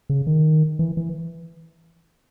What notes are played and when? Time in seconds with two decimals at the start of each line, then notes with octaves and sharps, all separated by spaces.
0.09 C#3
0.27 D#3
0.79 E3
0.97 E3